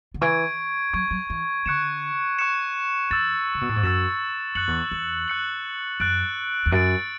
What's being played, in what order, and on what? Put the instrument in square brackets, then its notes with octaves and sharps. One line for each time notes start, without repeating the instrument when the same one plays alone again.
[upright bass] D3
[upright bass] E3 [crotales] C#6 G#6 D7
[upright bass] F#3 [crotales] C#6 G#6 D7
[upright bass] F#3
E3
[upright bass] D3 [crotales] C#6 F#6 C#7 E7
[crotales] C#6 F#6 C#7 E7
[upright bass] E2 [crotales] E6 A6 E7
[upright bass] C#3
B2
A2
G#2
[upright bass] F#2 [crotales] E6 A6 E7
[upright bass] F#2 [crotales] F#6 C#7 F#7
[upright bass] E2
E2
[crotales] F#6 C#7 F#7
[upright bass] F#2 [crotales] F#6 A6 D7
[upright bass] E2
[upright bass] F#2 [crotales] F#6 A6 D7